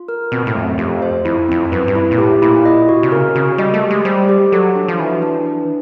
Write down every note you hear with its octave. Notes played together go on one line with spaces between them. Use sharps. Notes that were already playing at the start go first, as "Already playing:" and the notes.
Already playing: F4
A#4
B2 C4
A2
F2 A3
F#2
F2 G4
C5
F2 E4
F2 C4
F#2 B4
G2
E4
A#2
A2 G4
A#2 E4
D#5
F#4
C3
C#3 A#4
C#3 F#4
G3 D#5
A3
G4
G#3
G3 C5
G4
F#3 A4
D4
F3
E3 F#4
D4
B4